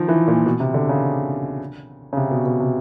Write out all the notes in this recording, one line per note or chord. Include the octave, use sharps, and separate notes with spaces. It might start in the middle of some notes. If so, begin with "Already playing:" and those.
Already playing: D#3 F3
E3
A#2
B2
C3
D3
C#3
C#3
C3
B2
B2
C3